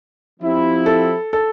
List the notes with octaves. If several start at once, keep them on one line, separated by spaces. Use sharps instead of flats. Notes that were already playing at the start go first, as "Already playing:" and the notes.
F3 C4 E4 G4
A4
A4